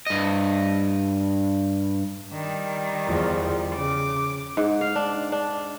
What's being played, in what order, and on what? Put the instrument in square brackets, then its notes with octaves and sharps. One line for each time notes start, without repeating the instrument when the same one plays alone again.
[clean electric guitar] G2 D#5
[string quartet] D#3 G3
[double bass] E2 F3
[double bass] C#3 [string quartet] D6
[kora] G#2
F5
D4
D4